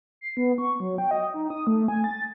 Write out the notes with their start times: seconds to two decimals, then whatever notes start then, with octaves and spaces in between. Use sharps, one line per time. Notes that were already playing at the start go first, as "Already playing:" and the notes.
0.21 C7
0.37 B3
0.58 C#6
0.80 F#3
0.98 G5
1.11 D#5
1.34 D#4
1.50 D#6
1.67 A3
1.88 G#5
2.04 A6